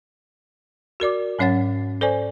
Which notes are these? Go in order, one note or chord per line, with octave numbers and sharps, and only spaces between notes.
F#4 A#4 D5 D6
G#2 F#3 C#4 C#5 F#5 A6
A4 C5 D5 G#5